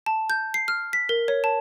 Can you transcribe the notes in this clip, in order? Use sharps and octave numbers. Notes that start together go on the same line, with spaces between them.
A5
G6
C7
F6
B6
A#4
C#5
A5